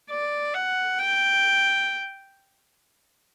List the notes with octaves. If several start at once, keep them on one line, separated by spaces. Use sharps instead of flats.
D5
F#5
G5